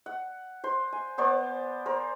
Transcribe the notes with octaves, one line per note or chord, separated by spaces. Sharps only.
F#5
C5 C6
G#5
B3 C5 D5
A#4 C5